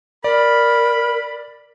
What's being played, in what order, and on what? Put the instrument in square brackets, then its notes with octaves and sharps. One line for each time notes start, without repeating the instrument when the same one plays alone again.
[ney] A#4 [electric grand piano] D5 [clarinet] B5